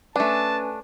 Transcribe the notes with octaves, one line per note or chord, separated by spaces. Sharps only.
A3 C#4 D4 B4 G#5 A5